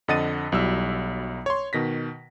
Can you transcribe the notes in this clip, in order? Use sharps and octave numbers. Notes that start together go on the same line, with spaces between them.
F2 D3 D#5 F#5 A6 D#7
B1 F#3 G3 E4 E6
C#5 C6
B2 D#3 A#6 B6